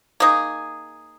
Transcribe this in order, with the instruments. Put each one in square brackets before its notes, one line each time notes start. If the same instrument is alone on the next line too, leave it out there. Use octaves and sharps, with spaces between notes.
[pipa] A#3 D#4 G#4